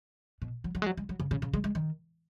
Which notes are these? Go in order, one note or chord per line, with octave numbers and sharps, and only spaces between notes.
B2
F#3
F#3
G#3
F#3
G#3
F#3
C#3
C#3
C#3
G#3
G#3
D#3